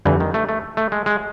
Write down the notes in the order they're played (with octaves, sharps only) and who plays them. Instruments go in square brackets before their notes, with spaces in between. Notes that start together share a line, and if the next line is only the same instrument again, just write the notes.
[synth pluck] F2 D3 G3 [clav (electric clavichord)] E3
[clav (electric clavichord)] D#3
A3
A3
A3
G#3
G#3